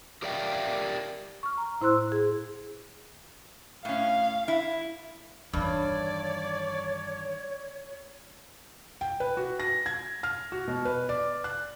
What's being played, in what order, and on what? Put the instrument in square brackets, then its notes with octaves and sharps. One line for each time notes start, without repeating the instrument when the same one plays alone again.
[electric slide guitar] G4 A#4 D5 E5 F5 G5
[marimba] C#6 F6
A#5
A2 E4 C5 C6 E6 F#6
G#4
[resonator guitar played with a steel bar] A2 C#4 [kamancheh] F5
[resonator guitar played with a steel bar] E4
[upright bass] E2 D#3 [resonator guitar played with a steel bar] G2 [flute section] C#5 [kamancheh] D5
[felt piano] G5
B4
F#4
A#6
G#6
F6
F#4
B2
B4
D5
F#6